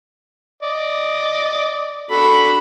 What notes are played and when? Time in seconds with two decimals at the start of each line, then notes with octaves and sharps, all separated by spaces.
0.63 D5 D#5
2.10 D4 F#4 A4 B5